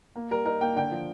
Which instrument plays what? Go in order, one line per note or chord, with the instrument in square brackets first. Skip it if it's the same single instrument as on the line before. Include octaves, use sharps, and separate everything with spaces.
[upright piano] A#3
G3 A#4
D#4 A#4
A#3 G5
D3 G5
F3